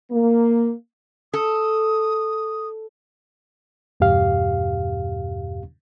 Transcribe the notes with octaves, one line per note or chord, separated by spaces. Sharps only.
A#3
A4 D#6
E2 G2 B2 G4 F5